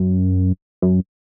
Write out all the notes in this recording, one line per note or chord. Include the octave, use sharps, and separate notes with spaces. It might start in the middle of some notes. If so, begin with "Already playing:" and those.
Already playing: F#2
F#2